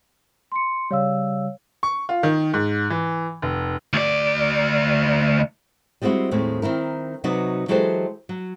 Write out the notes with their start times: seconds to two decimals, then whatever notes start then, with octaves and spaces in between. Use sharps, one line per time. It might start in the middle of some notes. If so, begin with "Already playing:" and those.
0.52 C6 C#7
0.91 C#3 G3 C#5 F5 E6
1.83 C#6
2.09 F4
2.23 D#3
2.54 G#2
2.90 E3
3.42 F1
3.93 D2 D5
6.02 G3 G#3 C4 E4 F#4
6.31 D#2 A2 G#3 C4
6.62 D#3 C4 E4 A#4
7.24 C3 F#3 B3 D#4 F#4 D5
7.68 E3 F#3 G#3 G4 A4 C5
8.29 F#3